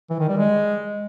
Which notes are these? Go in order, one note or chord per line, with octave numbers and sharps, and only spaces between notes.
E3
D#3
G3
G#3